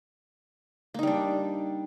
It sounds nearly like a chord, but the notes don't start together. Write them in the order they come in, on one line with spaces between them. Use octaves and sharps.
A#3 D#4 G3 D4